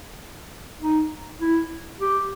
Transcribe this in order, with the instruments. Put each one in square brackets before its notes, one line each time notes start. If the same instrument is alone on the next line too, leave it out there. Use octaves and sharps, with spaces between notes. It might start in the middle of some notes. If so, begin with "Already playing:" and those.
[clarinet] D#4
E4
G4